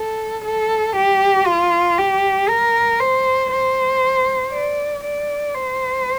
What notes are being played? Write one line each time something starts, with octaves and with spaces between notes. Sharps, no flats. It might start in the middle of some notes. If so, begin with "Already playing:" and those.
Already playing: A4
A4
G4
F4
G4
A#4
C5
C5
D5
D5
C5